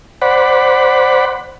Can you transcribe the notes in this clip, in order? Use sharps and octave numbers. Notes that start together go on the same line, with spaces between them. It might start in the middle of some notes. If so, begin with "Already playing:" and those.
C5 D5 F#5 B5